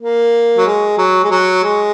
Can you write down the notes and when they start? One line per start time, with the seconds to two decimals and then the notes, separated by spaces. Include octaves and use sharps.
0.01 A#3
0.57 F#3
0.66 G#3
0.98 F#3
1.24 G#3
1.30 F#3
1.63 G#3